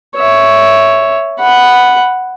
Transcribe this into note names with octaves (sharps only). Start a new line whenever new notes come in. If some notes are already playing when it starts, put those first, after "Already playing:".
C#5 E5
F#5 B5